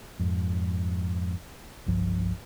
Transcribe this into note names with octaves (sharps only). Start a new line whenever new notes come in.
F2 G#2
G1 C2 G2 F3